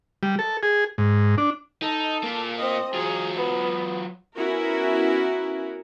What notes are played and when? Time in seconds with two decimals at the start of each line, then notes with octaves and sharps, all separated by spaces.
0.23 G3
0.39 A4
0.63 G#4
0.98 G#2
1.38 D4
1.82 D#4 A4
2.23 A#2 A#3
2.59 C4 D#5
2.94 F#3 F4 G#4
3.36 B3 B4
4.35 B3 C#4 E4 F#4 A#4